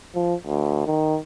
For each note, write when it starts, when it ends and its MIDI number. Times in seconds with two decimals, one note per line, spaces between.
0.15 0.34 53
0.47 0.83 38
0.86 1.19 51